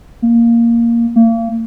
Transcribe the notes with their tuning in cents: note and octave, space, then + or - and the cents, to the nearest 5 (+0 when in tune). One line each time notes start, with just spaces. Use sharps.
A#3 +0
A#3 -35